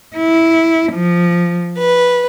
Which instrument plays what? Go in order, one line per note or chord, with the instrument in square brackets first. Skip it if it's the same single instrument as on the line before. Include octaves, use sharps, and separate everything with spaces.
[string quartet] E4
F3
B4